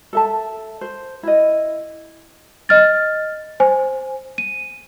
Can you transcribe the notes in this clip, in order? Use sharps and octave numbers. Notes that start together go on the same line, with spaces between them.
A4 E5 A5
C5
E4 D#5
D#5 F6 A6
C5 G#5
D#7